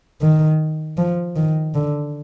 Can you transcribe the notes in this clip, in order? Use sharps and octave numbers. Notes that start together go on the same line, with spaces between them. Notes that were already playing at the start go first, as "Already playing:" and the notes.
D#3
F3
D#3
D3